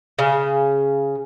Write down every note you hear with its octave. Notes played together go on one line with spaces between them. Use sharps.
C#3